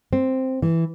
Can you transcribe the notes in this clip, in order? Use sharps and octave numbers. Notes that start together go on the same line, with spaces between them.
C4
E3